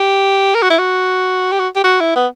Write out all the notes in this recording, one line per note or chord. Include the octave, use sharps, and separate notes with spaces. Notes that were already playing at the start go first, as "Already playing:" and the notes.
Already playing: G4
A#4
F#4
E4
F#4
G4
F#4
G4
F#4
E4
B3